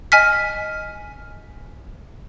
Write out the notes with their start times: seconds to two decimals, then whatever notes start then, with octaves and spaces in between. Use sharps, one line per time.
0.12 D#5 G#5 F6 B6